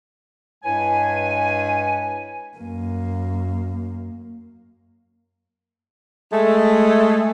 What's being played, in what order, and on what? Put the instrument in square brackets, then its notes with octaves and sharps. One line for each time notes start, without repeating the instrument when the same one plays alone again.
[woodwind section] G2 G#3 E4 B4 C#5 G#5
[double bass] F#2 A#3
[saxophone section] G#3 A3